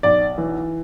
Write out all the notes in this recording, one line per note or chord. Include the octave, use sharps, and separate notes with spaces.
B1 D5
E3